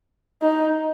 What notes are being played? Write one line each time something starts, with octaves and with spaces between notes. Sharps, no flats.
D#4